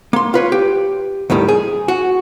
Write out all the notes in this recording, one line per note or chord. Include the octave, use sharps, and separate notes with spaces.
A#3 C6
F4 B4 C#5
G4
D#2 A2 D#3 G3
G#4
F#4